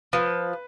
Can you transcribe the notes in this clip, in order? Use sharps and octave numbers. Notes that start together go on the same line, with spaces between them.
F3 B4